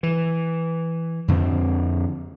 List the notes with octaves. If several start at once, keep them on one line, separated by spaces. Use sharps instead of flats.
E3
F2 D3 A#3 C4